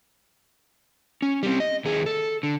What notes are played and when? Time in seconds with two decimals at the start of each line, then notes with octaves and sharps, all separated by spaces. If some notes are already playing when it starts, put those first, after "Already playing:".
1.22 C#4
1.43 G3 C4
1.60 D#5
1.85 D#2 G#4
2.06 A4
2.43 D3